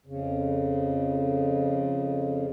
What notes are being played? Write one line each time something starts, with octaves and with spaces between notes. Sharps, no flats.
F2 C#3